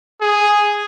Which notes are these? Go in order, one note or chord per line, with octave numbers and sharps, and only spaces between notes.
G#4